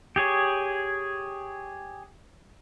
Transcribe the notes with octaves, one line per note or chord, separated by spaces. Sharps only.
G4 G#4 C#5